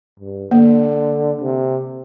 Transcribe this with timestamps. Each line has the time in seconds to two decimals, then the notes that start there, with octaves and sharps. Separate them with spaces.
0.20 G2
0.51 D3 A#3
1.41 C3